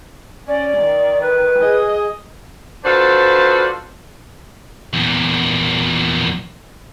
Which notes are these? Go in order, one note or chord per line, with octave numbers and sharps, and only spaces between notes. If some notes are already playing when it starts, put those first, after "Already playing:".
C#4 D5
D#3
B4
G#4 D#5
D4 F4 F#4 A4 B4 C5
E2 A#2